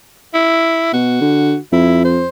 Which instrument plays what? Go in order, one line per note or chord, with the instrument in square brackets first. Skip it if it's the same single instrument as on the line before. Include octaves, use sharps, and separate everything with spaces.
[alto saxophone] E4
[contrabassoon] B2 [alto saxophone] F#4
[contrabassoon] D3
[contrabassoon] F2 [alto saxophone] E4
[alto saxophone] C5